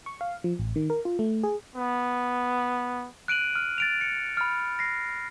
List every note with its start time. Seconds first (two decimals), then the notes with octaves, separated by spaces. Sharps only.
0.06 C#6
0.21 F5
0.44 F3
0.59 A1
0.76 D#3
0.90 A#4
1.05 F4
1.19 A3
1.43 G#4
1.76 B3
3.28 F#6 D7 D#7 F#7
3.55 F6
3.78 A6 D7 F7
4.01 C#7
4.37 B5 F6
4.79 A#6 C7